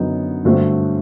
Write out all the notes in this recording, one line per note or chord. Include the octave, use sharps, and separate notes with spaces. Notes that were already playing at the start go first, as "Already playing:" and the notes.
Already playing: F#2 D3 F#3 B3 D#4
G2 D3 F#3 A3 C4